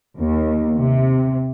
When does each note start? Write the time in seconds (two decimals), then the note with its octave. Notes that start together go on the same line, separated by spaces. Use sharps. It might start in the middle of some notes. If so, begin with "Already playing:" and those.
0.18 D#2
0.78 C3